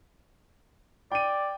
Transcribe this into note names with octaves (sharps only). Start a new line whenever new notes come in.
D5 G5 D#7